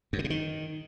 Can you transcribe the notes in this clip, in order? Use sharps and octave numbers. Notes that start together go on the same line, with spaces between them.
F#2
D3
C3
D#3